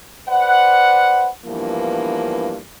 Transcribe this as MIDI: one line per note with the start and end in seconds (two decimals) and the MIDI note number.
0.29 1.28 71
0.29 1.28 72
0.29 1.28 74
0.29 1.28 78
1.45 2.58 38
1.45 2.58 43
1.45 2.58 52
1.45 2.58 53
1.45 2.58 58
1.45 2.58 59